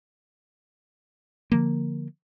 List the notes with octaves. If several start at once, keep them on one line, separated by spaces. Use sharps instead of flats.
D3 F3 A#3